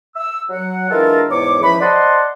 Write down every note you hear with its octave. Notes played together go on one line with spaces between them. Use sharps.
E6
F#3 F#5
E3 G#3 D4 F4 A4 A#4
E2 G#2 C#5 D6
C#2 E3 F3 B5
C5 D5 D#5 F#5 A5 C6